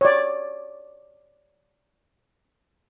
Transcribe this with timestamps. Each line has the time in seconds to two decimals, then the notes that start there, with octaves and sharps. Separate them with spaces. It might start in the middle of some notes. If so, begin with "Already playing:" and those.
0.01 C#5 D5